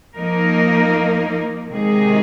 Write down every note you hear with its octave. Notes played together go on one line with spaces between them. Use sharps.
F3 A#3 D#4 A#4
C3 D#3 G#3 D#4 G#4